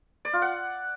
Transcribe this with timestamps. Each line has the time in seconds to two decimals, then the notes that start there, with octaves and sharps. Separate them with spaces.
0.25 D5
0.33 F4
0.42 F#5